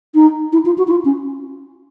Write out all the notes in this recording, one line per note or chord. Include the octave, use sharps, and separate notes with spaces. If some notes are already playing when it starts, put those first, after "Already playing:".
D#4
E4
F4
F#4
E4
F4
C#4